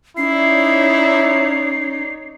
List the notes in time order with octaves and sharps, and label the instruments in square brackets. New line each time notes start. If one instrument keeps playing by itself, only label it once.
[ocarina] C#4 [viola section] D#4 C#5 D5 [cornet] E4 [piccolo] C7